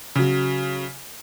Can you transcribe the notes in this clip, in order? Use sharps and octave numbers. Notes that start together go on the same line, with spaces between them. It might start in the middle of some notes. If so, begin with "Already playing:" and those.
C#3 F#3